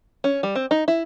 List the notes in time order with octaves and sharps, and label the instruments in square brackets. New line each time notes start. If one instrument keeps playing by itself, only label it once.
[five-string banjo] C#4
G3
C4
D#4
E4